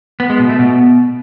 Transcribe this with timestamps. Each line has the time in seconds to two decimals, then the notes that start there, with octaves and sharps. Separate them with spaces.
0.20 B3
0.30 G#3
0.40 B2
0.49 A3
0.59 B2